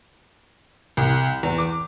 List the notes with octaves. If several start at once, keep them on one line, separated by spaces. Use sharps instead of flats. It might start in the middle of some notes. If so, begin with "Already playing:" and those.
C2
E2
D6